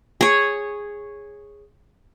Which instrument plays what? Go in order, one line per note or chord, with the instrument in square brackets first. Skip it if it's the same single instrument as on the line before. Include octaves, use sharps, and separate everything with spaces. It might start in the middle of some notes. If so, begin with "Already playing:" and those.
[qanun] G#4 C#5